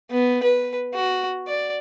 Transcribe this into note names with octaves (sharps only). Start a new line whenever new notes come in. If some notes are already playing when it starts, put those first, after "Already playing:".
B3
B4
F#4
D5